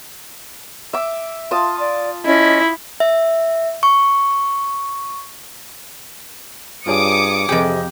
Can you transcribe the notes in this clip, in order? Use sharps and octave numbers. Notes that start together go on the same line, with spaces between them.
E5 D6
F4 A5 C6 D#6
D5
C#4 E4 D#5
E5
C#6
G2 F4 G#4 C#5 D6 D#6 C#7
F2 C3 G4 G#4 D#5